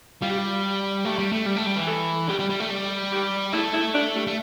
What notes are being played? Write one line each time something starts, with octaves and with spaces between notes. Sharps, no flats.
G3 F4
G4
F4
A3 G4
G3
A3
G3
A3
G3
E3
A4
G3 G4
G3
G3
A3
G3
G4
A3 E4
E4
D4
G3
A3